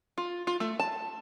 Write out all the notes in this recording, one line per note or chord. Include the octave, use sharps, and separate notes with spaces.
F4
F4
A3
A5